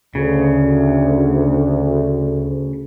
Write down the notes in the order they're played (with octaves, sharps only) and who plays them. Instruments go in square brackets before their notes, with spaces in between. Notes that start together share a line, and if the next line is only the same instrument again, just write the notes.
[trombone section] D2 [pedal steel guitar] C#3